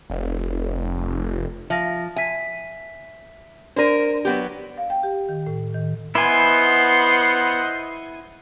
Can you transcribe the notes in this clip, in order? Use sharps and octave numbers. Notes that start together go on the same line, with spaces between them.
F1
F3 E5 F5 A#6
E5 G#5 B6
D4 A#4 C5 D5 D#7
F#3 B3 G4
F5
G5
G4
D#3
A2
D#3
B3 E4 C5 D#5 F#5 G#5 C6